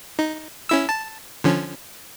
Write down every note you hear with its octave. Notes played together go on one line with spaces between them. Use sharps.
D#4
C#4 E4 E6
A5
D3 F3 C#4